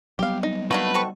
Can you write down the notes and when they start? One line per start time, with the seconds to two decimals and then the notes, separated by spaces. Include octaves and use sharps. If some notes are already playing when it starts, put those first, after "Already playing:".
0.19 F#3 G3 B3 G4 F5
0.43 D#4
0.71 A3 A#3 D4 D#4 F#4 B4
0.94 C4 A4 C#6